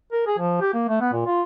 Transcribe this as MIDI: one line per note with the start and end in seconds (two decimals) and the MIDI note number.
0.12 0.22 70
0.27 0.38 68
0.39 0.56 53
0.61 0.74 67
0.74 0.86 58
0.89 0.99 57
1.01 1.12 59
1.13 1.23 46
1.26 1.42 65